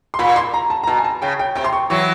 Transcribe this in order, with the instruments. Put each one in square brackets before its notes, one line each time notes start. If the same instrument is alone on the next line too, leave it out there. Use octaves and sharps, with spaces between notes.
[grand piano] C6
[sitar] A#2 [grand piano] B5
[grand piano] C6
A#5
A5
A#5
[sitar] B2 [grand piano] A5
[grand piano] G#5
A5
[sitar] C#3 [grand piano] G5
[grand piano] G5
[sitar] C3 [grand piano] G5
[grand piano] C6
C#6
[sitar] E3 F#3 [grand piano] C#6